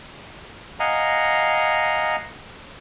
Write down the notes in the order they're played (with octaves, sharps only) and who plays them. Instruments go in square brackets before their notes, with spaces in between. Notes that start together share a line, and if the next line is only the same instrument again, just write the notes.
[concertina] D#5 F5 F#5 G#5 A#5